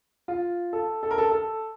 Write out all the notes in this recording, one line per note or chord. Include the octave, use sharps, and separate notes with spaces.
F4
A4
A4
A#4
A4
A4